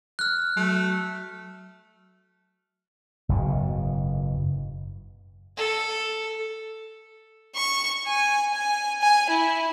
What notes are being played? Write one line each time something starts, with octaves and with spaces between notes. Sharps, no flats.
F6 F#6
F#3 A3
F#1 G#2 B2
A4
C#6
G#5
G#5
G#5
E4